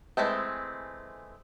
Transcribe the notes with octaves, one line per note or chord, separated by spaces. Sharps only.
E3 F#3 G#3 A3 C4